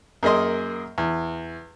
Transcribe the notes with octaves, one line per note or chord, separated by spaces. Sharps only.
F#2 A#3 G#4 D#5 C6
E2